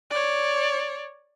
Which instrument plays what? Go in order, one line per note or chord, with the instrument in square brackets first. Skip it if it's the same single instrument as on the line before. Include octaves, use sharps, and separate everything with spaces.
[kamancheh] C#5 D5